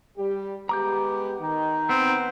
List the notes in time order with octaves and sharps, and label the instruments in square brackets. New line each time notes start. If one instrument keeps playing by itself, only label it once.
[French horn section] G3 G4
[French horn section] G#3 B3 G4 [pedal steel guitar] A#5 D6 G6
[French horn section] D#3 [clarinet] D#4
[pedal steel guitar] B3 [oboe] C4